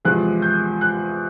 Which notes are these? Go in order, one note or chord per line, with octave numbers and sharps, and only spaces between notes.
E2 C3 F3 G#3 F#6
G6
F#6